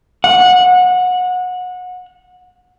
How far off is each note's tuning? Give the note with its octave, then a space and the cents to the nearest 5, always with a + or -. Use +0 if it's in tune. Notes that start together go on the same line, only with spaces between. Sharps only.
F#5 -25